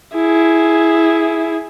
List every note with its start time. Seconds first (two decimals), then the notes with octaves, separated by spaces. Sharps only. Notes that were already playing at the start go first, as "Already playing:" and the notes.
0.15 E4 G#4